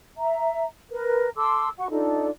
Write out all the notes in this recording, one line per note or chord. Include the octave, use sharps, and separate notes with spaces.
E5 A#5
A#4 B4
A4 C6 D6 E6
F#4 F#5 C#6
D4 D#4 F4 A4